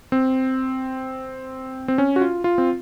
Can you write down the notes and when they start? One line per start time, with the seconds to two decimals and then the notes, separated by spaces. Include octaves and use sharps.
0.12 C4
1.88 C4
1.98 C#4
2.16 F#4
2.21 F4
2.44 F4
2.58 C4